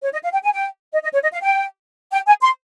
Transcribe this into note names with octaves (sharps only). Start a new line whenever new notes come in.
C#5
D#5
F5
G5
G#5
G5
D#5
D#5
C#5
D#5
F5
G5
G5
G#5
C6